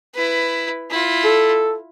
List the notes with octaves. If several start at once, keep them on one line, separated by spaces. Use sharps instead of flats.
E4 B4
E4 F4
A4